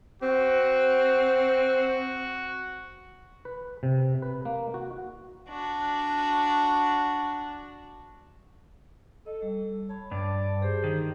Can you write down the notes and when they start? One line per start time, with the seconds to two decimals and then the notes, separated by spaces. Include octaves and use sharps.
0.22 C4 F#4
3.45 B4
3.83 C3
4.22 B4
4.45 A#3
4.74 F#4
5.48 D4 F#4
9.26 A4 D#5
9.42 G3
9.89 C#5 A5 B5
10.11 G2 D5
10.62 G4 G#4 C5
10.84 D#3